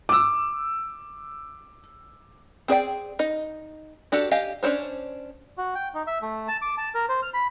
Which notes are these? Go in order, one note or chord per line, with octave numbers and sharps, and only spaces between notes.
D6 E6
C4 G#4 D5 G5
D#4 D#5
D4 F#4 G4 A4
G4 D#5 F5 G#5
C#4 D4 A4 C5 C#5
F#4
G5
D#4
E5
A3
A5
D6
A5
A#4
C5
F6
B5